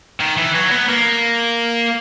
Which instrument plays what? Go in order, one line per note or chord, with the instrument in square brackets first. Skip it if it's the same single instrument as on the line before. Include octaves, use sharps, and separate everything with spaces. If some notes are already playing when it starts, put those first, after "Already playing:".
[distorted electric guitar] D#3
E3
F#3
B3
A#3